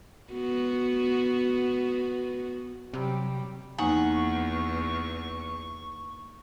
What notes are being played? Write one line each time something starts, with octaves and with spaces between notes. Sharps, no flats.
B3 F#4
C3 F#3 G3 G4
E2 A#3 D#4 F#5 G#5 C#6